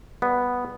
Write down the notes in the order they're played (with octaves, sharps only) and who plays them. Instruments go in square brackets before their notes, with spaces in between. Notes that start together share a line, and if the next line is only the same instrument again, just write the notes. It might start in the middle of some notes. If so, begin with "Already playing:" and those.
[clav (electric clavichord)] G3 B3